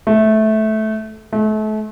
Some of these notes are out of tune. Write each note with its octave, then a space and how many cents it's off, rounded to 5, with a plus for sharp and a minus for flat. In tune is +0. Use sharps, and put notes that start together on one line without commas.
A3 -15
A3 -35